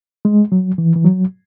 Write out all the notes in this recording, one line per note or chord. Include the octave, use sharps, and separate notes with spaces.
G#3
F#3
E3
E3
F#3